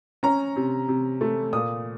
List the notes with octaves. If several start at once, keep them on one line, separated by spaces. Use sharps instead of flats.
C#4 A#5
C3
C3
A3
A#2 D#6